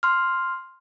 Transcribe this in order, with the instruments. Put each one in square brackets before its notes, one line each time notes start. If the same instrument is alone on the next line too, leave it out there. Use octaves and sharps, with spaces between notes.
[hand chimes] C6 F6